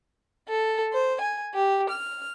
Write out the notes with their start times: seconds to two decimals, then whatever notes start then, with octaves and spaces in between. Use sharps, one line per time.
0.48 A4
0.92 C5
1.21 G#5
1.53 G4
1.89 F6